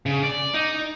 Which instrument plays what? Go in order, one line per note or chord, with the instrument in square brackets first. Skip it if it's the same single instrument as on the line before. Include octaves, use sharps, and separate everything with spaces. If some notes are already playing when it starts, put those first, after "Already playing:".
[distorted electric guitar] C#3
D5
D#4